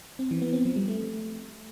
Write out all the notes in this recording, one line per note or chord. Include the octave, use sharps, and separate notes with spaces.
C4
E3
B3
C4
F3
G3
A3